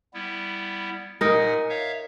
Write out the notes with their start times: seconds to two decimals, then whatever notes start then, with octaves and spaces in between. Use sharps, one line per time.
0.14 G3 B3 E4
1.21 A#2 D#4 A#4 F#5 G#5
1.69 C#5 E5 F5